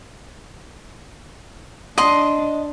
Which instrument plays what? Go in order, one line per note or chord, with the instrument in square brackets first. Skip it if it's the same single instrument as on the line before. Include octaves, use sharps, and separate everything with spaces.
[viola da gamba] D4 [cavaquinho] D#5 C6